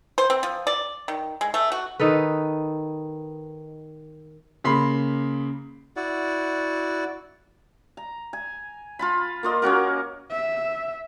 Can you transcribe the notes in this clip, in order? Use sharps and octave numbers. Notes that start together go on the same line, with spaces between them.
C5
C4
F3
D5
D#3
G#3
A3
F#4
D#3 D#4 A4 B4
C#3 A#3 B5 C6 C7
E4 F#4 D5 F#5
A#5
G#5
F4 A5 B5
A#3 F4 D#5
A#3 C#4 F#4 A#4
E5